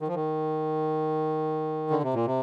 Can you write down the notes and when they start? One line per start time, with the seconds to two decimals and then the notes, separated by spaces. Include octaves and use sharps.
0.01 D#3
0.08 F3
0.15 D#3
1.91 D3
2.03 C3
2.14 A#2
2.26 C3